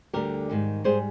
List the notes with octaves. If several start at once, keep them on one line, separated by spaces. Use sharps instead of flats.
D2 D3 G3 G4 A#4
G#2 D#3 G3
G#2 G3 G#4 C5